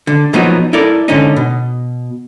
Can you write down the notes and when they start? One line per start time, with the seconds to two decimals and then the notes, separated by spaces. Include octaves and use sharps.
0.07 D3
0.33 A#2 F3 F#3 B3 D#4
0.73 E4 A4 A#4 D5
1.08 G#2 D3 C#4 D#4
1.36 B2